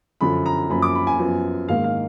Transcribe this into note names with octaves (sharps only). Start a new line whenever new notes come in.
F#2 D3 F3 B5
A#5
F#2 F3 A#3 B5
D6
B5
G#5
F#2 F3 B3
G#2 D#3 A#3 F5
F5